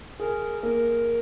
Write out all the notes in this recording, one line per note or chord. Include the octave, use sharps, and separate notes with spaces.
G#4 A#4
A#3 A#4